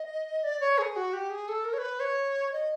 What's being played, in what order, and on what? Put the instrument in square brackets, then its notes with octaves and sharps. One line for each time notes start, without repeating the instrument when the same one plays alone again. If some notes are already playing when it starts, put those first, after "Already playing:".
Already playing: [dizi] D#5
D5
C#5
G#4
F#4
G4
G#4
A4
A#4
C#5
B4
C#5
D#5